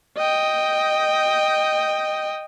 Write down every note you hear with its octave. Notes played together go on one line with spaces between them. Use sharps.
D#5 G5